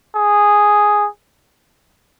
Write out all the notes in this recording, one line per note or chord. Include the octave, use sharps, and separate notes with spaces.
G#4